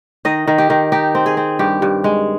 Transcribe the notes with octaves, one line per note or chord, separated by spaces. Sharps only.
D#3 D#5
D#3
G4
D#3
D#4 G4
C4
G#4
C4
G2 G4
G2
G#3